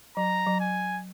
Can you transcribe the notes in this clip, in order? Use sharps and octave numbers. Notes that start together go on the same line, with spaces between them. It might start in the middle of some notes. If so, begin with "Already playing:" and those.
F#3 A#5
F#3
G#5